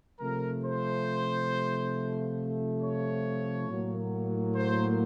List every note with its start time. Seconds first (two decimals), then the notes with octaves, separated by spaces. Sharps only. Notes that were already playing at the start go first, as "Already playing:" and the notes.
0.20 C3 F3 A3 A#4
0.64 C5
2.82 C#5
3.69 A2 F#3 A#3
4.55 C5